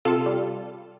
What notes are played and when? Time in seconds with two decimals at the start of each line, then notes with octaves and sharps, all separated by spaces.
0.05 C3 F4 A4
0.26 G3